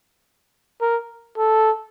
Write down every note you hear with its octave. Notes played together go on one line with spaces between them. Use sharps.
A#4
A4